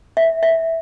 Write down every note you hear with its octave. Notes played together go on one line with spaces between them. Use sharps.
E5
E5